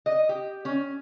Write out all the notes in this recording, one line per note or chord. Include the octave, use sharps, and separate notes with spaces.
D#5
G4
C#4